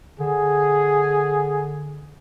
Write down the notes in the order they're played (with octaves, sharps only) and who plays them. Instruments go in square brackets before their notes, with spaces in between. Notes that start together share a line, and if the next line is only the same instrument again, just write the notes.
[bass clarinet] D3 [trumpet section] G#4